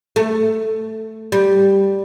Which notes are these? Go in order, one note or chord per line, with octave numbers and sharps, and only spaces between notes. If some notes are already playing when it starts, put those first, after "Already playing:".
A3
G3